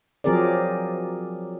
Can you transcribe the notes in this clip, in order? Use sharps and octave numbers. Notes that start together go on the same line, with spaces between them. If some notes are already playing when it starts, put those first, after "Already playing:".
F3 F#3 C4 G#4 A#4 D5